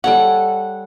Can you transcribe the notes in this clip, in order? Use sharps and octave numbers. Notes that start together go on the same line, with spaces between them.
G3 A4 C#5 F#5